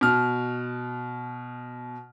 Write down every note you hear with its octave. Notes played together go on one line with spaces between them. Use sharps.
B2 F6